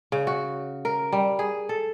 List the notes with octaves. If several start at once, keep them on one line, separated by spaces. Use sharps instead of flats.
C#3
F#4
A#4
G3
G#4
A4